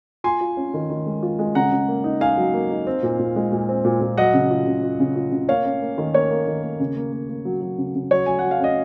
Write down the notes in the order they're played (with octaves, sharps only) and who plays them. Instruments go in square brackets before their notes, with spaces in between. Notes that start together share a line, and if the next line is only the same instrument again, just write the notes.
[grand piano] F4 G#5 C6
F4
C#4
D#3
D#3
G#3
F4
G#3
C#3 F#5 A#5
C#3
A#3
D#4
D#4 F5 G#5
F#3
A#3
D#4
C4
A#2
A#2
G#3
A#2
C4
A#2
A#2
F#3 D#5 F#5
C#3
F4
C#3
F4
C#3
F4
C#3
A#3 C#5 F5
C#4
A#3
D#3
A#3 C#5
A#3
D#3
A#3
C#3
A#3
A#3
A#3
F#3
F#3
C#3
C#3
F#3 C#5
F#3 G#5
F#3 F#5
F5
C#4 D#5